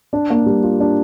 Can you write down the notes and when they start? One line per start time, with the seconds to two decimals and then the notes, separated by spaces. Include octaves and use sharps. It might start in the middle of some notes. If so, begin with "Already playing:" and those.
0.13 D4
0.30 A#3
0.46 G3
0.63 F4
0.80 D4